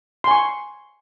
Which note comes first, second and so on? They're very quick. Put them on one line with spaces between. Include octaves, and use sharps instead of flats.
C6 G#5 C#6